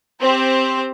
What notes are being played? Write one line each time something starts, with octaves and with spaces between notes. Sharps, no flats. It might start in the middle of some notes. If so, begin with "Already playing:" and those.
C4 G4 C5